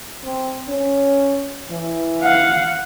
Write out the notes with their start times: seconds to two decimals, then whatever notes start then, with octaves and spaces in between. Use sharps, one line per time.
0.24 C4
0.68 C#4
1.71 E3
2.22 F5 F#5